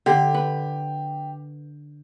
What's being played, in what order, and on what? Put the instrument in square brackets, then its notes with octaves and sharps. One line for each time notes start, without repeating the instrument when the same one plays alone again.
[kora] D3 [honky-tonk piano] G4
[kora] B4